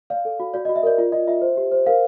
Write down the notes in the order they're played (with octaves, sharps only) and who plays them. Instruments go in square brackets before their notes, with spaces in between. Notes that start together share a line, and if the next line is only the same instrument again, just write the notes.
[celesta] D5 F5
A4
F#4
F#4 D5
F#4 D#5
E5
A#4 D5
F4 D5
F4 D#5
F4 E5
C5
G4
C5
A#4 F5